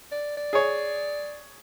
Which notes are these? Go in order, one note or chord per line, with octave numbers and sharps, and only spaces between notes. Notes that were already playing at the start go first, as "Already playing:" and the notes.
D5
D5
G#4 C#5